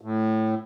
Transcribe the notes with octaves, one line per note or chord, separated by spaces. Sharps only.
A2